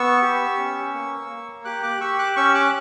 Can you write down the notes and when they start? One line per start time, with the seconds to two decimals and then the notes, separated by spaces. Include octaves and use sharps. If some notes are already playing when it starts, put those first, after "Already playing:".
Already playing: B3 C#6 E6
0.22 G4
0.58 C#4
0.94 A#3
1.30 A#3
1.65 G4 D6 F#6
1.83 D6 F#6
2.01 G4 C#6 E6
2.19 D6 F#6
2.36 C#4 C#6 E6
2.54 D6 F#6